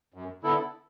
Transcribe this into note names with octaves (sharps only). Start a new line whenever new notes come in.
F#2
D3 B3 E4 A4